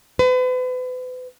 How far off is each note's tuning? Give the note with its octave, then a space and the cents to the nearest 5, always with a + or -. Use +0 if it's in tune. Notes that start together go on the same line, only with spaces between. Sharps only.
B4 +40